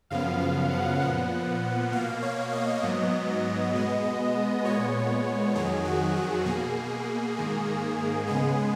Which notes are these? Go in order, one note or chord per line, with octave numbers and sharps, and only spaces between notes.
F#2 C#3 F3 B3 F5
F5
F#5
A#2 F3 B3 F#5
B2 A#3 F5
C#5
D#5
G#2 F#3 B3
B2 G#3 B3
A#2 G#3 B3 C#5
F2 D#3 F#3 G#4
F#4
G#4
B2 A#3 G#4
G#2 D#3 A#3
C#3 G#3 B3 G#4